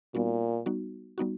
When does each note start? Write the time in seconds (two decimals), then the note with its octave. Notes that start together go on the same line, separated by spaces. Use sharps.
0.14 A#2 G3 B3 D#4 F#4
0.66 G3 B3 D#4 F#4
1.18 G3 B3 D#4 F#4